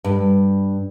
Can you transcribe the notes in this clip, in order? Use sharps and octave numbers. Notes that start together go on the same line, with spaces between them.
G2